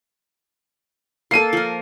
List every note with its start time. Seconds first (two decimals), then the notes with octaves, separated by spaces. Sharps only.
1.31 A#3 A4 C7 D#7
1.53 F3 A#4